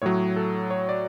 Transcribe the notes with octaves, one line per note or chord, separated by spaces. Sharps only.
A2 F#3 C#5
A4
C#5
D5